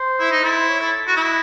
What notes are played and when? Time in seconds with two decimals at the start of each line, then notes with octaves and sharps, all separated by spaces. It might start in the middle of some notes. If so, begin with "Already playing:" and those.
Already playing: C5
0.19 E4
0.31 D#4
0.43 E4 A4
0.56 C5
0.68 C#5
0.80 A4
1.07 F#4
1.16 E4 D#5